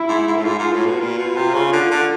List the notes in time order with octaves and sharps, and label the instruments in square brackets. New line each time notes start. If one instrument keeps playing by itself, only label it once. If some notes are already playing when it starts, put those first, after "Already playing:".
Already playing: [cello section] E4
[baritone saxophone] G#2
G#2
A2
[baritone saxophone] G#2 [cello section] F4
[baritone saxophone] G#2
A2
B2
[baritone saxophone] A#2 [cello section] F4
[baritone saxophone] B2
C3
C#3
D3
D3